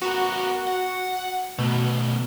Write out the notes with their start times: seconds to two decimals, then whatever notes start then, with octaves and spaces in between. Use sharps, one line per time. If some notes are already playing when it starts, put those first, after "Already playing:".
0.02 B3 F#4 A#4
0.67 F#5
1.59 B2 D#3 A3